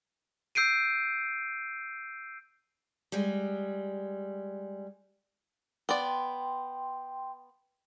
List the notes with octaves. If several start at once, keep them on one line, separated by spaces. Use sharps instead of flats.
E6 G6 C7 D7 D#7
G3 G#3
B3 D5 G5 C6